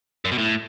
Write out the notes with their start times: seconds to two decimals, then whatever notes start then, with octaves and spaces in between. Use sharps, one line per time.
0.25 F#2
0.31 B2
0.38 A2